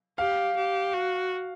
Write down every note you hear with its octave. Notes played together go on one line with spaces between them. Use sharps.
G4 F5
G4
F#4